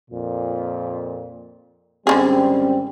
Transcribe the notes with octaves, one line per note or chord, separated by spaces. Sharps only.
F2 A#2
G#1 D3 E3 G3 C4 C#4 G#4